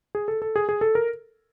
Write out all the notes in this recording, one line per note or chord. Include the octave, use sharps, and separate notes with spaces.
G#4
A4
A4
G#4
G#4
A4
A#4